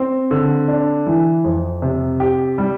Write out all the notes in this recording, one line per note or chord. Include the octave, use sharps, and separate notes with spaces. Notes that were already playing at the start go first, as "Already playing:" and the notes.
Already playing: C4
D3
D4
E3
F2
C3
G4
G3